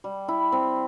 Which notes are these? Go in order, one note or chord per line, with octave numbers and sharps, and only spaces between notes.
G3
E4
C4